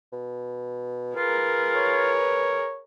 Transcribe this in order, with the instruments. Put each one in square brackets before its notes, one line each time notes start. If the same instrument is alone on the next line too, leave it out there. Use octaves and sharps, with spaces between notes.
[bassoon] B2
[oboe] F4 [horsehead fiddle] G#4 A#4 [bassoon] B4
[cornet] C#5